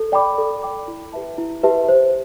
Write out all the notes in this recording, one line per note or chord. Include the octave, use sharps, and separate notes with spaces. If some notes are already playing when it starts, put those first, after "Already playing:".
Already playing: A4
D5 G5 B5 D6
A4
D5 G5 B5 D6
E4
G4 B4 E5 A5
E4
G4 B4 E5 A5
C5